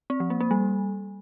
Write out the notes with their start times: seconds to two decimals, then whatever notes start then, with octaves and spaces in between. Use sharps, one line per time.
0.10 C4
0.20 F3
0.30 A#3
0.40 A#3
0.51 G3